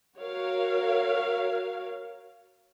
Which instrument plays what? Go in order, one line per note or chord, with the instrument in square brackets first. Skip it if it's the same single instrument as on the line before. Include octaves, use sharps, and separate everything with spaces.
[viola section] F#4 A#4 C#5 F5